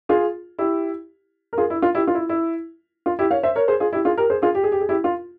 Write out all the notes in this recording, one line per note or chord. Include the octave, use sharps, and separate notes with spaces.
F4 G#4
E4 G4
A#4
F4 G#4
E4
F4
E4 G4
F4
E4
E4
F4
E4 G4
C#5 F5
C5 E5
A#4 C#5
G#4 C5
F4 G#4
E4 G4
F4 G#4
G4 A#4
G#4 C5
F4 G#4
G4
G#4
G4
G#4
E4 G4
F4